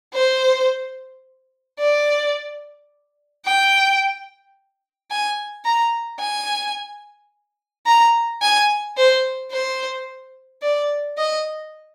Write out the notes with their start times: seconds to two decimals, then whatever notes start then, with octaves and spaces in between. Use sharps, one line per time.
0.14 C5
1.79 D5
3.45 G5
5.11 G#5
5.65 A#5
6.20 G#5
7.86 A#5
8.42 G#5
8.97 C5
9.52 C5
10.62 D5
11.18 D#5